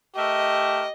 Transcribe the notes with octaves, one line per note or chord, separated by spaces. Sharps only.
A3 G4 A#4 D#5 E5